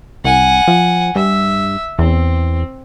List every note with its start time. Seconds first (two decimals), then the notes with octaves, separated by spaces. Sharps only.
0.25 C2 F#5 G#5
0.68 F3
1.16 G2 E5
1.99 E2 C4